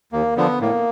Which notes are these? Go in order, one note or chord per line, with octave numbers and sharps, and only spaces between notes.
D#2 A#3
D3 F3 B3
A2 A#3